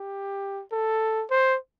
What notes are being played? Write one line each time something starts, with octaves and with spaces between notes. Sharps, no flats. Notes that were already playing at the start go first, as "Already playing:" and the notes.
Already playing: G4
A4
C5